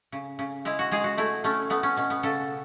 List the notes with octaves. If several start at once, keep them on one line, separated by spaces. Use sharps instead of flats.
C#3
C#3
G#3 E4
F#4
G#3 G#4
F#4
A3 E4
A3 C#4
A3 B3
C#4
B2 C#4
B3
C#3 A4